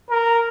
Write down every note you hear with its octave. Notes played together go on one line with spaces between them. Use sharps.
A#4